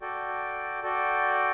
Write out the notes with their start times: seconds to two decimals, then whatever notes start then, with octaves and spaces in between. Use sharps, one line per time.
0.01 F#4 A4 D5 G5
0.83 F#4 A4 D5 G5